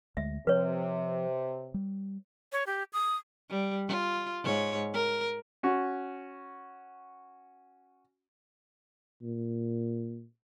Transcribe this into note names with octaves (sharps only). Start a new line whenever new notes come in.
D2 G#3 E5
C3 F3 B4 C#5
G3
C#5
G4
D#6
G3
F4
G#2 C#5
A#4
C#4 F#4
A#2